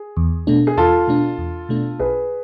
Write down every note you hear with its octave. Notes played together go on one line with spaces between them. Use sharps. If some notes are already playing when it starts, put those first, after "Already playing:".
Already playing: G#4
E2
B2 A3 D4
G#4
E2 F4 A4
B2 A3 D4
E2
B2 A3 D4
B1 G#4 B4